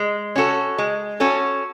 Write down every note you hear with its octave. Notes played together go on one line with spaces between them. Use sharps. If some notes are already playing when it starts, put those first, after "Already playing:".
Already playing: G#3
C#4 F#4 A4
G#3
C#4 F#4 A4